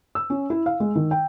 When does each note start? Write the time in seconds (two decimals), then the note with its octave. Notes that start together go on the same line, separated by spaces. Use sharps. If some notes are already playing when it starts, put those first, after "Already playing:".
0.15 E6
0.30 C#4
0.50 E4
0.66 F5
0.80 G#3
0.95 D#3
1.11 G5